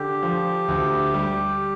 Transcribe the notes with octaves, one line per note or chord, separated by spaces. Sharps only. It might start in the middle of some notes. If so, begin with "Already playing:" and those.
Already playing: D3 G4
F3
D2
G3